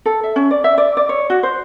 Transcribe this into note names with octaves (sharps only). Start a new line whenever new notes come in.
A4
E5
C#4
D5
E5
D5
D5
C#5
F#4
C5